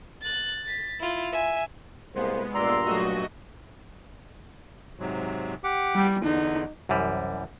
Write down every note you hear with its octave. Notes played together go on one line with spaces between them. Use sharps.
F#6 A6
A6 B6
E4 F4
E5 G#5
C2 G#3 A#3 B3 C5
G2 A#2 D5 A#5 C6 E6
F#3 A3 F#4 D#5
G#2 C3 F#3
G4 F#5 D6
G3
E2 D3 D#4
C2 F#2 E3 G3